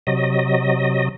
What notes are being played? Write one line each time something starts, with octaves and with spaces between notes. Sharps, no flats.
C3 F#3 D#5